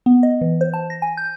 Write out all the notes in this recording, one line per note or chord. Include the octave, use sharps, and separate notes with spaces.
B3
D#5
E3
C5
A5
A#6
G#5
G6